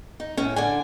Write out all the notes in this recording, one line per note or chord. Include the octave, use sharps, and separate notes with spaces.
D#4
A2 C#4
D3 D4 G#5